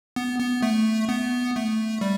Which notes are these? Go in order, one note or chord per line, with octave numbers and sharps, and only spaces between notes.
B3
B3
A3
B3
A3
G3